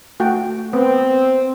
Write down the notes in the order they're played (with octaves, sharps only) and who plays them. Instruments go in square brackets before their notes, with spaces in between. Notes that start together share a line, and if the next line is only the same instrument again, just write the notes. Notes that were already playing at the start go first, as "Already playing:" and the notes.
[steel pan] A3 F#4 G5
[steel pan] B3 [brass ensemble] C4